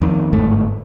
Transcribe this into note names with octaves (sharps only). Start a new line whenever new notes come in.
F2 D#3
G1 G#2 A3